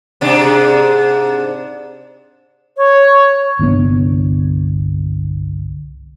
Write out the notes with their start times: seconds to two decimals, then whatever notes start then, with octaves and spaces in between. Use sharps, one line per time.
0.21 G#2 C3 D4
2.77 C#5
3.59 G1 C2 D3 B3